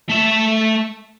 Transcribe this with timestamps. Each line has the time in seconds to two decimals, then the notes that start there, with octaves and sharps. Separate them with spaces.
0.10 A3 E5